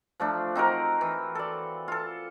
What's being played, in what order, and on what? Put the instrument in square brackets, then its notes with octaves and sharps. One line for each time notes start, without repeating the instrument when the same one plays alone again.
[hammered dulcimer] F3 A3 D4
C4 D#4 F#4 A#4
E3
A4 D5
F4 A4